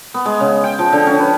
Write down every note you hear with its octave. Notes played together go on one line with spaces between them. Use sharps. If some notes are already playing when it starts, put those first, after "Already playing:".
B3
G#3
C#3
G5
F3
D3
C#4
B4